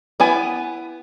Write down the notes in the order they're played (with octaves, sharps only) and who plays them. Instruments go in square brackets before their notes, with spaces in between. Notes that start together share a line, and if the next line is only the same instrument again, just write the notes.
[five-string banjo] B3 E4 G#5